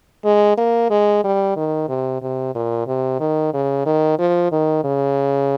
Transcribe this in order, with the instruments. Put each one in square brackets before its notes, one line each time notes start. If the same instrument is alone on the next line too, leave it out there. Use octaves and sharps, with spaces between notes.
[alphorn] G#3
A#3
G#3
G3
D#3
C3
C3
A#2
C3
D#3
C#3
D#3
F3
D#3
C#3